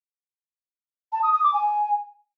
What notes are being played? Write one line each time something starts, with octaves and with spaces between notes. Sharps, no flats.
A5
D#6
D#6
D6
G#5